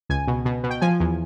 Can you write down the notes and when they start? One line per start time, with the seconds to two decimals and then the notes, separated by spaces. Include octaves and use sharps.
0.09 C#2 G#5
0.27 B2
0.45 B2
0.63 B2
0.70 G5
0.81 F3 G#5
1.00 E2